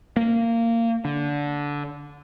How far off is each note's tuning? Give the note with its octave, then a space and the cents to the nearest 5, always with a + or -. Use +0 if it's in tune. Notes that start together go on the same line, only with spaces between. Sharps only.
A#3 -20
D3 -15